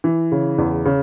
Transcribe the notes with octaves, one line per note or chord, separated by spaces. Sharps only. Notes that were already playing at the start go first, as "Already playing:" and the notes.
E3
C#3
E2
C#3